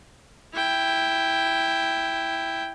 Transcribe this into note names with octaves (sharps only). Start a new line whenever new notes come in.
E4 G5